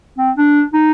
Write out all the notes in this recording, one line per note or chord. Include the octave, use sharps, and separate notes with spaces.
C4
D4
D#4